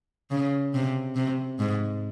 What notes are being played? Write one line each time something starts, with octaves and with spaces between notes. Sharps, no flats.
C#3
C3
C3
G#2